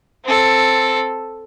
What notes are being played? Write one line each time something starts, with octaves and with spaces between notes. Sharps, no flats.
C4 A4